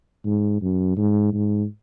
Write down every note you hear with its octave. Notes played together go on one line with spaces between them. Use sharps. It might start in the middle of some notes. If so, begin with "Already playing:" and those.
G#2
F#2
G#2
G#2